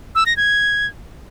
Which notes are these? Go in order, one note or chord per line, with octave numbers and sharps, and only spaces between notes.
E6
A#6
G#6